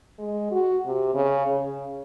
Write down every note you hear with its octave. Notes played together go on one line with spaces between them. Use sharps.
G#3
F#4
C3
C#3
C#3